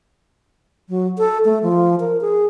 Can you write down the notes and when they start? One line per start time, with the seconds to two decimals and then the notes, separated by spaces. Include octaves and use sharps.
0.89 F#3
1.18 A4
1.45 A3
1.63 F3
2.00 A#4
2.21 G#4